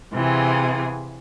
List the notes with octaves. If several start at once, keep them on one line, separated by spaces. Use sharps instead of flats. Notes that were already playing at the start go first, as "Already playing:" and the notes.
C3 E3 F4 G#4